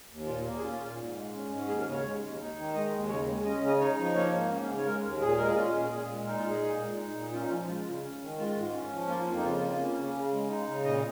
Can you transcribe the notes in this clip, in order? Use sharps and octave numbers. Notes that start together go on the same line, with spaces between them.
D#2
A#2 F4
A#3
G#4
C#4 F4
A#2
G#2
G#3
C#4
G#2
D#2 G#4
A#4
C#3
C#5
G#3
D#2
D#4
D#3
G#3 D#5
D#2
C#3 C#5
G#3
C#4 D#5
C#3 D#5
D#4 C#5
F3
A#3 C#5
G#2
C#4
C#3
C#5
G#3 A#4
D#2
A#2 G#4
G#3 A#4
G#4
C#4 F4
A#2
A#2 G#4
G#3
D#4 A#4
F4
A#2
G#4
A#2
G#3
D#4
A#2
C#4 F4
D#4
F3 F4
G#3 F4
C#3
C#4
D#3
G#3 F4
G#2
C#4
F3
A#3 F4
F2
D#4
C#3 F4
A#3
C#4
C#3
C#3
G#3
D#4
C#3
A#2 D#5